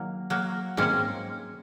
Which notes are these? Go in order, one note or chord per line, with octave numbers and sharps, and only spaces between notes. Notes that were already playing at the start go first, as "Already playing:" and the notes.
Already playing: D#3 F#3 A#3
F#3 A#3
G#2 D#3 G#3 A#3 C4 C#4